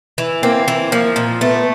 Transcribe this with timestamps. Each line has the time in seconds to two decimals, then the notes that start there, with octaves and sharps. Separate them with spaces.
0.18 E3
0.43 A#3 C4
0.68 E3
0.92 F3 A#3
1.16 A#2
1.41 A3 B3